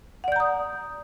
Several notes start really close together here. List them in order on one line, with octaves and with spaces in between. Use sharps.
F#5 D5 G6 A#5 D#6